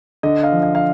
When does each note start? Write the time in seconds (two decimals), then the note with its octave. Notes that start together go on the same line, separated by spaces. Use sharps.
0.23 D3 D#5
0.43 F5
0.52 F3
0.63 F5
0.75 F5